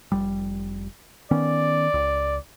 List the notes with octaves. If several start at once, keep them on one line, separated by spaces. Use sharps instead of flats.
F1 G3
D#3 B3 C#4 D5
C#2